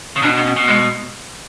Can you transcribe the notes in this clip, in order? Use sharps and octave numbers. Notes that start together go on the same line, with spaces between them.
C#3
B2 D4
B3
C#4
B2
G#3